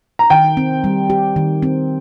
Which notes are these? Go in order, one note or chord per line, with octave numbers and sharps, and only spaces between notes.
A#5
D#3 G5
C4
G3
G4
D#3
C4